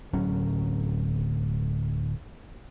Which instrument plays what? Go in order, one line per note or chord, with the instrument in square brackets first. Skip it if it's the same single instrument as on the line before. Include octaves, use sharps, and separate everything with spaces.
[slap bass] D1 F#3 C#4